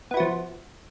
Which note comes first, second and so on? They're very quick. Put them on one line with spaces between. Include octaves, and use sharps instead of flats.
B3 E4 F#4 F3